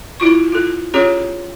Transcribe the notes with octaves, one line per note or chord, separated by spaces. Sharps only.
E4 F4 C#6
F4 A4
C#4 F4 G4 G#4 C#5